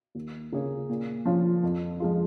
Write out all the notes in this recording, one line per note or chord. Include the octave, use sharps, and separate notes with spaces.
D#2
C#3 A#3 C#4 G#4
A#2
F3 C#4 F4
F2
F3 G#3 F4